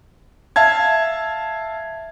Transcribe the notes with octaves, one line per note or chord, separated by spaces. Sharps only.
E5 F5 A5 G#6